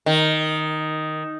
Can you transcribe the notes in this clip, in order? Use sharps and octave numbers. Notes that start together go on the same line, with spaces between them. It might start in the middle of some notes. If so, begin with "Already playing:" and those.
D#3